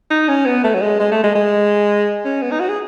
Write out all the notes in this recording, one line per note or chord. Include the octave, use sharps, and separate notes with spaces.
D#4
C#4
B3
A3
F#3
G#3
G#3
A3
G#3
G#3
C#4
B3
D#4
F#4
G#4